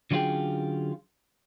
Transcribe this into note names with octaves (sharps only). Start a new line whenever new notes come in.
D3 F#3 C#4 F4 G#4 G5